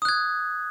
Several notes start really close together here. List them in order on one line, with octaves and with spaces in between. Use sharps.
D#6 F#6 G#6